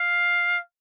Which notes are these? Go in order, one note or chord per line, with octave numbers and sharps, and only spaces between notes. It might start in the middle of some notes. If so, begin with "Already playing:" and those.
Already playing: F5